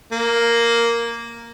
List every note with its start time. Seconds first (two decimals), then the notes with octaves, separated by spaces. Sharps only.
0.12 A#3